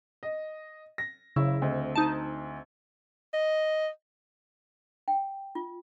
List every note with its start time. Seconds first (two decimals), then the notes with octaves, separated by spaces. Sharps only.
0.23 D#5
0.98 A#6
1.36 F#1 C#3 E4 E6
1.62 D2 C4 D#5
1.96 D#4 A5
3.33 D#5
5.08 G5
5.55 F4